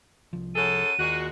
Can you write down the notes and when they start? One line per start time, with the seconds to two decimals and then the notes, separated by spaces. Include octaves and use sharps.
0.33 C2 F3
0.55 F#2 G#4 A4 D#7
0.98 D#2 A#2 G#3 F#4